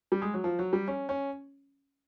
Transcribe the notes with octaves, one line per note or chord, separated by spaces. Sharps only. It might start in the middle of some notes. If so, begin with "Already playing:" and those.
G3
G#3
F#3
F3
F#3
G3
C#4
C#4